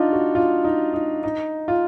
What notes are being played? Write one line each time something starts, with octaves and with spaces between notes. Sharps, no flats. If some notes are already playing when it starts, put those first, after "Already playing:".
Already playing: D4 D#4 F4
F#4
F4
D#4
D#4
D#4
F4